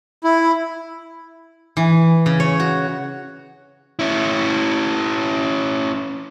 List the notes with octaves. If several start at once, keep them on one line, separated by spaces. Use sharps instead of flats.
E4
E3
C#3
C#5
F#4
C#4 E4